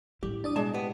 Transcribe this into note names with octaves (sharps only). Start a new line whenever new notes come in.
A2 G3 E4 G4
D4 D5 D#6
B2 G#3 D5 A5
B3 G4